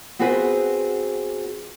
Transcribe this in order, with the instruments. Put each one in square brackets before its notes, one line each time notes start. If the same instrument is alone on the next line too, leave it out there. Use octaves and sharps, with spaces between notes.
[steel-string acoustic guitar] B3 C4 F#4 G#4 B4 C5